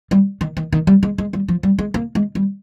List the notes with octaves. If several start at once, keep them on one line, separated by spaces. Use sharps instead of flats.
G3
D#3
D#3
D#3
G3
G#3
G#3
G3
F3
G3
G#3
A#3
G#3
G3